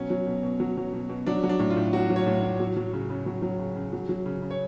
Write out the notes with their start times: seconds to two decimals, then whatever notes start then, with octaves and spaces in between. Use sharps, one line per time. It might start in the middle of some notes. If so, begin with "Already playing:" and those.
Already playing: B2 F#3 C#4
0.10 F#3
0.27 B2
0.43 B2
0.60 F#3
0.77 F#3
0.93 B2
1.09 B2
1.27 F#3 D4
1.43 F#3
1.49 D4
1.59 A2
1.70 F4
1.77 A2
1.93 F#3 F#4
2.10 F#3
2.16 C#5
2.27 A2
2.43 A2
2.60 F#3
2.77 F#3
2.93 C#3
3.10 C#3
3.26 F#3
3.42 F#3
3.59 C#3
3.76 C#3
3.93 F#3
4.09 F#3
4.26 C#3
4.42 C#3
4.50 C#5